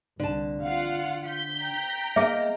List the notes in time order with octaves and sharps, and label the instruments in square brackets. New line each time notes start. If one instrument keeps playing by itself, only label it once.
[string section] C2 [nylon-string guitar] D3 A5
[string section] F4 F#5 [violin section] F5
[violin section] G6 B6
[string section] G5 A#5
[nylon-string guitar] A#3 D#5 [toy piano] G#4 E5